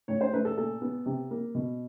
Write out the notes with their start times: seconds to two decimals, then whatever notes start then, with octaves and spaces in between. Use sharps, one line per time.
0.08 A2 C#5
0.21 C5
0.33 A3 B4
0.45 A4
0.57 A#2 A4
0.82 B3
1.06 C3
1.31 A#3
1.55 B2